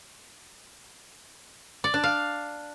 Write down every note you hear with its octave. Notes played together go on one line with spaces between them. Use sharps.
D5
D4
F5